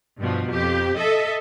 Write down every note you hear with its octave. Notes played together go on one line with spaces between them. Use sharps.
G2 B2 F3
F2 G4
A4 D#5 E5